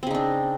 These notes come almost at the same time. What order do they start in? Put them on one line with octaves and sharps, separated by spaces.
C4 C#3 D#4 D4